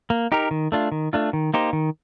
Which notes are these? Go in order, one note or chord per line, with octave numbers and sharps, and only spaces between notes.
A#3
D#4 G4 A#4
D#3
A3 D4 F4
D#3
A3 D4 F4
D#3
A#3 D#4 G4 C5
D#3